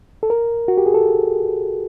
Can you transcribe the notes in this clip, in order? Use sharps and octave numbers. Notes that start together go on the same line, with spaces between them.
A4
A#4
F#4
G4
G#4
A4